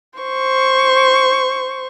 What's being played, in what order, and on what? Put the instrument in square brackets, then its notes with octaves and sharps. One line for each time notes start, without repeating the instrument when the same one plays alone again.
[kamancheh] C5 C#6